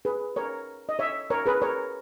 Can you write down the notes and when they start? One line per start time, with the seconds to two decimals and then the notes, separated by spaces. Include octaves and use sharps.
0.05 G#4 B4
0.36 A#4 C#5
0.89 D#5
0.99 C#5 E5
1.30 A#4 C#5
1.46 G#4 B4
1.62 A#4 C#5